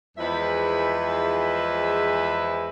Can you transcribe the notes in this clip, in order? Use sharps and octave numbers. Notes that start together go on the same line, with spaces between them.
E2 F3 G#3 E4 B4 E5